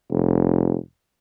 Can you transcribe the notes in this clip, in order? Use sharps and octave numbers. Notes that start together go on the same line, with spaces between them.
F1